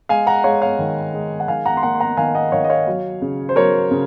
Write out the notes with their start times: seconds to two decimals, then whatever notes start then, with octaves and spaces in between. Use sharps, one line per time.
0.09 G#3 F5 G#5
0.27 F#5 A#5
0.44 G#3 C#5 F5
0.62 C#5 F5
0.79 D#3
1.13 G#3
1.40 F#5
1.48 D#3 F5 G#5
1.65 F#5 A#5
1.77 C6
1.83 A#3 F#5 A#5
1.94 C6
2.00 F#5 A#5
2.17 D#3 F5 G#5
2.35 D#5 F#5
2.52 D#3 C#5 F5
2.64 D#5
2.70 C#5 F5
2.87 F#3
3.22 C#3
3.49 C5
3.56 F#3 A#4 C#5
3.91 C#3